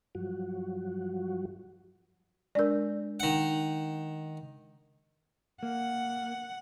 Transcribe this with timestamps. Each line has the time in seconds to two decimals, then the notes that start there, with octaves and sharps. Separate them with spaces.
0.15 G2 F3 F#3 F#4
2.55 G#3 D4 A#4 D5 E6
3.20 D#3 F#5
5.63 A#3 F#5